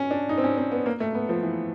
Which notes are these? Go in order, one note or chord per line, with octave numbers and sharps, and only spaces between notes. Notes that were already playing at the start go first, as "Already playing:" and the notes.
Already playing: C#4
D4
D#4
C4
C#4
C4
B3
A#3
A3
B3
F3
E3